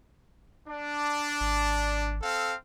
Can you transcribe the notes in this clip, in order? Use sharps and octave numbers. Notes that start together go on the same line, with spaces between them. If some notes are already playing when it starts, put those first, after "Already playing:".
D4
G#1
C4 A4 F5